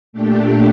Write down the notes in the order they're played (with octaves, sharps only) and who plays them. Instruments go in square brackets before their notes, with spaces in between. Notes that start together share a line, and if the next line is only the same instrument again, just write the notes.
[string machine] A#2 A3 D4 G4